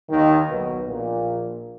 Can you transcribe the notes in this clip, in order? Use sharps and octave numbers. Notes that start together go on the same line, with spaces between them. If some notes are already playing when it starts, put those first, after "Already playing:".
D#2 D#3
B1 B2
A#1 A#2